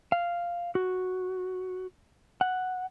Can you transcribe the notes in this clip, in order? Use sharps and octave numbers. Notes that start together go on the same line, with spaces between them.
F5
F#4
F#5